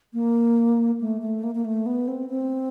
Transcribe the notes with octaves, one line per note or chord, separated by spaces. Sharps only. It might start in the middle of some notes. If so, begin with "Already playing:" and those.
A#3
A3
A3
A#3
A#3
A3
B3
C4
C4